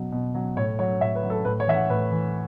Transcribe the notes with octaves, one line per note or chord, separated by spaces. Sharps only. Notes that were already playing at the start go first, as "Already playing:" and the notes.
Already playing: B2 F#3
B2
F#3
A2 C#5
F#3 C#5
A2 E5
B4
F#3
A4
A2 B4
C#5
E3 E5
F#5
A2 B4
E3